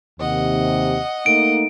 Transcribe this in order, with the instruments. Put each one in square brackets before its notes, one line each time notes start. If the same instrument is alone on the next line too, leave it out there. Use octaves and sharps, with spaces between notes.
[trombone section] D#2 C3 [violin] D#5 F#5
[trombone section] A3 A#3 D#4 [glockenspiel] D7